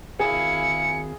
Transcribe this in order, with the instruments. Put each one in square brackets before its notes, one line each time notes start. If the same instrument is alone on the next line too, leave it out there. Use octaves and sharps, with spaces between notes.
[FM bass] G#1 [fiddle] E4 F5 [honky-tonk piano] G#4 [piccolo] C#7